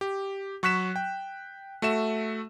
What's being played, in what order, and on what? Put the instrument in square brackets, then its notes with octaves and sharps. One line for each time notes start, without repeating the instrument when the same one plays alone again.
[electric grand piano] G4
F#3 C#6 F#6 B6 E7
G5
A3 F#4 E5 E7